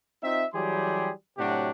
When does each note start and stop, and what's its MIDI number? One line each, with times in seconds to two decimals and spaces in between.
0.22 0.44 60
0.22 0.44 63
0.22 0.44 65
0.22 0.44 76
0.53 1.09 52
0.53 1.09 54
0.53 1.09 55
0.53 1.09 67
0.53 1.09 68
0.53 1.09 84
1.38 1.70 45
1.38 1.70 48
1.38 1.70 54
1.38 1.70 62
1.38 1.70 66
1.38 1.70 67